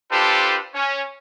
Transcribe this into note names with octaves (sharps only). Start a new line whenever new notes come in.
D4 F4 G4 A4 B4 C5
C#4